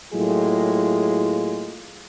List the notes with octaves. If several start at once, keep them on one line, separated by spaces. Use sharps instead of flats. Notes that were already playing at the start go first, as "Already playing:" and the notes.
A2 F#3 G#3 A#3 F4 G#4